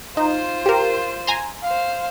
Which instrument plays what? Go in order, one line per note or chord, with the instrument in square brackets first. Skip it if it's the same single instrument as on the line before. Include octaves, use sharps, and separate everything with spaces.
[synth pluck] D#4 [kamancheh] F4 C5
[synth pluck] G4 A#4
G#5 A#5 C6
[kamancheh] C5 F5